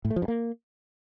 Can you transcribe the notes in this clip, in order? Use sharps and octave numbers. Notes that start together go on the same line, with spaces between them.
A2
A3
F3
G2
A#3